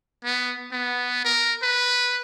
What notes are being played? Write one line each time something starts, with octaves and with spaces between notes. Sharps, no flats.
B3
B3
A#4
B4